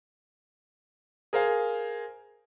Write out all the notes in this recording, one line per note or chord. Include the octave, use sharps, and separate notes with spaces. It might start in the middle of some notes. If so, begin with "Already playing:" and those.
G#4 A#4 C5 F5 G#5